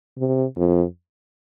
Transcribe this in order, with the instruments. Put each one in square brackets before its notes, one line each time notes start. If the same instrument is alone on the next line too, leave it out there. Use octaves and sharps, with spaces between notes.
[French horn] C3
F2